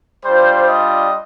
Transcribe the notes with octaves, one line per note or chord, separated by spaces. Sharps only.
G3 D4 F4 C5
D#5